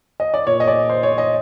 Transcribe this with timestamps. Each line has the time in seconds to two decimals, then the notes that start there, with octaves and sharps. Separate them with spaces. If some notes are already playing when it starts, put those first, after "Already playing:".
0.20 D#5
0.34 D5
0.47 A#2 C#5
0.60 D#5
0.68 D5
0.89 C5
1.03 C#5
1.18 D#5